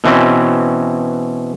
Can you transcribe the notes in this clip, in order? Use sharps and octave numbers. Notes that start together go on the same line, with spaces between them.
B2 E3 C4 C#4